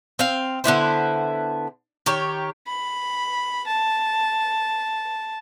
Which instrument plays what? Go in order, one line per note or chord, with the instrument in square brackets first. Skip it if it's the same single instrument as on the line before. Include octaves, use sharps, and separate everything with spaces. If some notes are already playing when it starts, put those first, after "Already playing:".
[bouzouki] C4 F5
D3 B3 E4 C5
D#3 G4 C#5
[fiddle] B5
A5